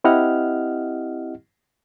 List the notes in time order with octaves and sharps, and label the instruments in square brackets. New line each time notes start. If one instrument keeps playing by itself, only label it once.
[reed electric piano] C4 E4 G4 D#5 F#5 F6